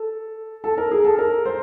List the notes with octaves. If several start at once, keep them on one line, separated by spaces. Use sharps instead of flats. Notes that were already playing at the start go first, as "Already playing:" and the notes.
Already playing: A4
A4
A#4
G#4
A4
A#4
C5